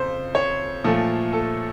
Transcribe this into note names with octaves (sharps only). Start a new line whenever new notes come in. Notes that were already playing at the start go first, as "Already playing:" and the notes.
Already playing: F2 C#3 C5
C#5
A#2 F3 A3
A4